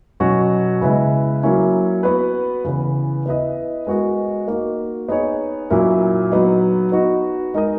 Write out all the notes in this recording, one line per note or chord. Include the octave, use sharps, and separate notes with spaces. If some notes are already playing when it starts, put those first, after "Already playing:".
B2 F#3 C#4 F#4
C#3 G#3 B3 E4 B4
F#3 A#3 C#4 E4
B3 F#4 B4
C#3 E3 B3
B3 E4 B4 D#5
G#3 B3 F#4 A#4 D#5
A#3 D#4 F#4
B3 D#4 G#4 C#5
A#2 F#3 C#4 E4 A#4
F#3 B3 D#4
B3 D#4 F#4
G#3 D#4 A#4 D#5